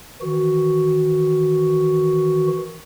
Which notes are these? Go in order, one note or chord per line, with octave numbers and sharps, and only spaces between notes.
D#3 E3 F#4